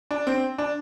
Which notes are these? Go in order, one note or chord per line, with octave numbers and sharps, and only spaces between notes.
D4
C4
D4